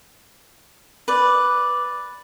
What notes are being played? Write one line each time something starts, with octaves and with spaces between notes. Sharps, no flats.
B4 D5